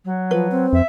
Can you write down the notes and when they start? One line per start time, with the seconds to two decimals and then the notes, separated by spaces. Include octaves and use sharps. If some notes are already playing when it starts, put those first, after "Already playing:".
0.05 F#3
0.31 F3 B4
0.51 C4
0.73 F2 E5